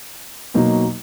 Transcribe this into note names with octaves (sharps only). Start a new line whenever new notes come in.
B2 F#3 A#3 D#4